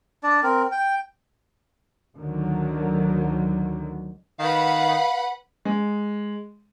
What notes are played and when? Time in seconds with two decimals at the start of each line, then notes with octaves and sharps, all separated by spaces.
0.23 D4 D5
0.43 C4 A#4
0.72 G5
2.17 D2 D3 D#3 F#3
4.39 D#3 B4 F5 F#5 B5
5.65 G#3